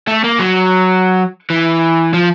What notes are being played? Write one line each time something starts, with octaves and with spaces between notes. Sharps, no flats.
A3
A#3
F#3
E3
F3